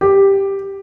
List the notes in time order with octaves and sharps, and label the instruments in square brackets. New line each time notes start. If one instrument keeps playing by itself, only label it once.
[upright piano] G4